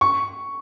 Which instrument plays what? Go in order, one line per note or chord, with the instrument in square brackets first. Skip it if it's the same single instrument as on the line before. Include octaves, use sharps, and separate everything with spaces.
[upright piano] C#6